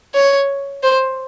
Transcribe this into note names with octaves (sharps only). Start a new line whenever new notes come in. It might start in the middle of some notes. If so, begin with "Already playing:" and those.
C#5
C5